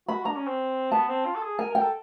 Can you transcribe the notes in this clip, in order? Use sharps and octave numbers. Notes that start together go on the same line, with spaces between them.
F#4 B5
D4 A#5
C#4
C4
B3 A5
C4
F4
A4
G#4
A#4 G#5
A#4
G5
A4